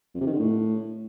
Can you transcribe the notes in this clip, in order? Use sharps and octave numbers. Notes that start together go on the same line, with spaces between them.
F2
C3
D#3
D3
A2